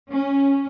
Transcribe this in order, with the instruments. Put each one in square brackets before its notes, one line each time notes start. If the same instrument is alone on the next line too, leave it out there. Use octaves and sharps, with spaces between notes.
[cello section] C#4